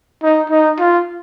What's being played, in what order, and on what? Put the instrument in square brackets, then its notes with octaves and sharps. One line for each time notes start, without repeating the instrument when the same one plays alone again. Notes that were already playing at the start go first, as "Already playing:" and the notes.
[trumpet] D#4
D#4
F4